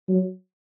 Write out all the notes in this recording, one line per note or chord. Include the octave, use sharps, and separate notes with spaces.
F#3